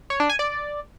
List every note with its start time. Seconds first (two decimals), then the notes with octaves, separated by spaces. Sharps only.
0.10 C#5
0.20 D4
0.30 G#5
0.39 D5